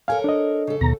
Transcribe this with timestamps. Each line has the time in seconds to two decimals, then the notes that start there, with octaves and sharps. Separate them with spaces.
0.08 A4 A#4 C#5 F5 G#5
0.24 D4 D#5
0.67 C#3 A4
0.81 D#2 B2 A#5